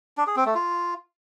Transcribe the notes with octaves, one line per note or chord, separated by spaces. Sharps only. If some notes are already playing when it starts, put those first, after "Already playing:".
D4
G#4
C4
A3
F4